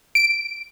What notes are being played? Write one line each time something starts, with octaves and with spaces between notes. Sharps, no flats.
D7